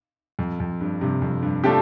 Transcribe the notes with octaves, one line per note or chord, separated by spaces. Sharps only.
F2
F2
G2
G2 C3
F2
G2
F3 A3 D4 G4